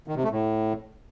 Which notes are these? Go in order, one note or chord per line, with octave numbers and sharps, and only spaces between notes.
D#3
C3
A3
A2